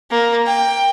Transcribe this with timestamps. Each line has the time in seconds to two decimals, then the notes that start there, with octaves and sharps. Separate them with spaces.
0.11 A#3
0.47 G5